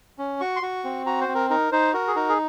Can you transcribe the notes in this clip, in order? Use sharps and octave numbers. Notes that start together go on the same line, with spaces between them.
C#4
F#4 C#6
C6
F#4 C#6
C4
F#4 A#5
C5
C4
A#4
D#4 A#4
D#4 C5
F#4 A#4
G#4
D#4 A#4
G#4